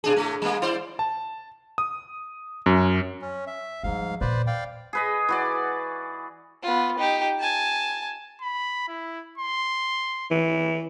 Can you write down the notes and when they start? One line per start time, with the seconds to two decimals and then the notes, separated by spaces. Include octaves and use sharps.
0.04 B2 D4 G#4
0.16 A2 A3
0.42 G3 A#3
0.62 E4 C5 D5
0.99 A5
1.78 D#6
2.66 F#2
3.22 C#4
3.47 E5
3.83 G#2 F3 G3 F5
4.21 E2 A#2 B4 C5 D5
4.47 D5 F5 G5
4.93 G#4 B4 D#5
5.28 E3 F#4 D5
6.63 B3 F4
6.99 D#4 G4
7.40 G#5 A5
8.42 B5
8.88 E4
9.38 C6
10.31 E3